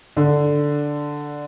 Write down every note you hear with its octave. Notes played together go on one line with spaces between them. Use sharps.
D3